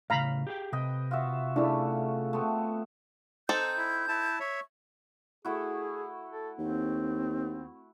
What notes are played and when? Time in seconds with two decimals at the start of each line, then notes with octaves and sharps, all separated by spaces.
0.10 A2 C#3 F5 A#5 B5
0.47 G4 G#4 G5
0.72 C3 B4 D#5 G5
1.11 F4 F#4 E5
1.56 C#3 A3 D4 E4
2.33 A3 B3 C4
3.49 C4 D#4 A4 G6
3.77 E4
4.08 E4 A5
4.40 C#5 E5 C#6
5.45 A3 E4 F#4 G#4
6.29 A4
6.59 D#2 C4